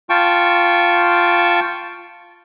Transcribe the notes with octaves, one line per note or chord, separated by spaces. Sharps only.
F4 G5 A5 C#6